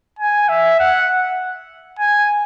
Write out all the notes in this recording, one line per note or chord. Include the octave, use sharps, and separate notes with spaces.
G#5
E5
F#5
G#5